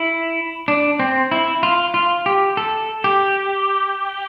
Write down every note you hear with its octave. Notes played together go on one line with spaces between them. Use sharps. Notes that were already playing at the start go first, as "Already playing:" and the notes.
Already playing: E4
D4
C4
E4
F4
F4
G4
A4
G4